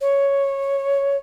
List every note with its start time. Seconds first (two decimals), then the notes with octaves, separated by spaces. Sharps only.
0.01 C#5